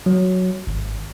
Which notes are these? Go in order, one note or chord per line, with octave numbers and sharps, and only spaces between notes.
F#3
G#1